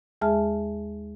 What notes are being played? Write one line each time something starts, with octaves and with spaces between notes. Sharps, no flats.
D#2 G#3 G#4 E5 A5 F6